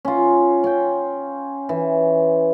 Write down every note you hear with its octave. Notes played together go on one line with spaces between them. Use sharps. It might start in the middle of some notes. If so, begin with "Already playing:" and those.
C#4 F4
C#4 G5
E3